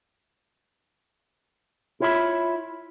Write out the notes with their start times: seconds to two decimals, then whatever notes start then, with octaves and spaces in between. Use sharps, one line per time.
2.00 E4 F4 C#5 D#5 E5 B5